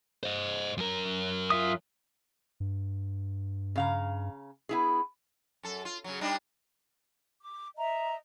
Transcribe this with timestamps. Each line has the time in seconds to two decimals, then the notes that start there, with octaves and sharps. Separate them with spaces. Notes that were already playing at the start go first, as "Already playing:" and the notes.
0.23 C5 D#5
0.77 F#2 A#4
1.50 F4 E5 D#6
2.60 G2
3.76 C#3 F5 A#5
4.69 B3 E4 G#4
5.63 F#2 A4
5.85 F4
6.04 C#3 F#3
6.21 G3 D4 D#4
7.41 D6
7.76 D#5 E5 A#5